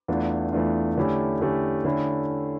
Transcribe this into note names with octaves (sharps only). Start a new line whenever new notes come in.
E2 E3 A3 D4 F4
E2 E3 A3 D4 F4
D3 A3 C#4 E4 G4
D3 A3 C#4 E4 G4
D3 A3 C#4 E4 G4